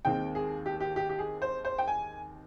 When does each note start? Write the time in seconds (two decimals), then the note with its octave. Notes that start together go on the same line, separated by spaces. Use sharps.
0.05 D#2 D#3 G#3 C4 G5
0.35 G#4
0.66 G4
0.80 G4
0.96 G4
1.09 G4
1.19 G#4
1.42 C5
1.65 C5
1.79 G5
1.88 G#5